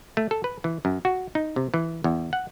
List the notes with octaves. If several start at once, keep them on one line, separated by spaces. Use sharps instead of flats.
A3
A4
B4
E3
F#2
F#4
D#4
C3
E3
E2
F#5